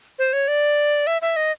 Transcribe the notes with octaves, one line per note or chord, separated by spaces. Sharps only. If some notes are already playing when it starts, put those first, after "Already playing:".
C5
C#5
D5
E5
E5
D#5